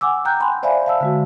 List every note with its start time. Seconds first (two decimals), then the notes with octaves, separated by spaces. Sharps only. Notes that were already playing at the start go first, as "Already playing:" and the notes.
0.01 F#5 G#5 D6 E6
0.25 G5 A#5 F#6 G6
0.40 G#5 B5 C6
0.63 C5 D5 E5 F5 G#5 B5
0.86 F5 A5 E6
1.01 D3 G#3 F#4